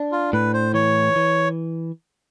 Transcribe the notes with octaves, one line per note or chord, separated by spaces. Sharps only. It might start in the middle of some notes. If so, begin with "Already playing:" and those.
Already playing: D4
F4
A2 B4
C5
E3 C#5
E3